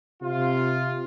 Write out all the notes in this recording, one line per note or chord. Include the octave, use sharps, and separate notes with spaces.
C3 F4